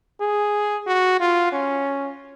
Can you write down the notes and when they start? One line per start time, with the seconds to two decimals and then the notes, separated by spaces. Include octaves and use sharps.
0.21 G#4
0.87 F#4
1.20 F4
1.52 C#4